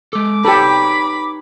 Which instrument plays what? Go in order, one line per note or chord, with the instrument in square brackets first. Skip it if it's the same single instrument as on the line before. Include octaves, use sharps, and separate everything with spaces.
[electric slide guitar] G#3 A4 [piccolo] D6
[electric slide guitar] D#4 B4 C#5 [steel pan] G4 A4 [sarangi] B5